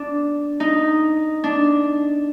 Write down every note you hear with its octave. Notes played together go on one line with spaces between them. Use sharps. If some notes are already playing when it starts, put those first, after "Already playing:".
Already playing: D4
D#4
D4